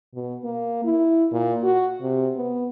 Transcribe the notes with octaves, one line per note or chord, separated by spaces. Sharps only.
B2
A#3
E4
A#2
F#4
C3
B3